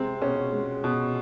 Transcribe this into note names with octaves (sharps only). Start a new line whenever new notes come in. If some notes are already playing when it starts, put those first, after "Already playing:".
Already playing: C3 G#3 C4
B2 C#4
G#3
B2